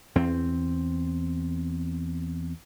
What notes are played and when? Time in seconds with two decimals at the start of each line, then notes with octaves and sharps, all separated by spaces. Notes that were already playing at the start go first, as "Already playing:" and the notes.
0.15 E2 C4